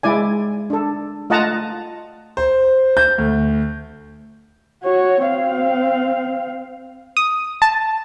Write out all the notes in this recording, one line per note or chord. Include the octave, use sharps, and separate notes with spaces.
G#3 E4 D5 G#5
D4 A4
A3 F4 D#5 F#5 A5 A#5
C5
G6
D2
F#4 C#5
C4 F5
D#6
A5